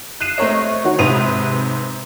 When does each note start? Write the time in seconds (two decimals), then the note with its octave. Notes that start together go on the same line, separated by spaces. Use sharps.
0.20 F#6 C7 D#7 E7
0.38 A3 C4 A#4 C#5 D#5
0.84 D#3 F#4 C#5
0.99 G#2 C3 B4 D#6 D#7 F7